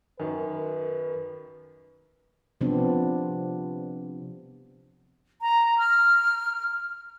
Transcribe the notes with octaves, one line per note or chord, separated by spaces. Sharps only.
F#2 D#3 B4
C3 F3 B3 C4 D4
A#5
F6